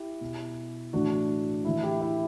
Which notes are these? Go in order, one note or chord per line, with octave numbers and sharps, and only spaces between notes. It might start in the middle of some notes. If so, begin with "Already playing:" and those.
Already playing: E4 G4
B2
A2 E3 D4 F#4
A2 E3 E4
E4 G4
E4